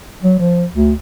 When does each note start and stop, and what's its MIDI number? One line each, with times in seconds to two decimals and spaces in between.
0.23 0.36 54
0.39 0.65 53
0.74 0.93 38